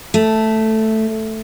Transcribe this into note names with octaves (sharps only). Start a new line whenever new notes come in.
A3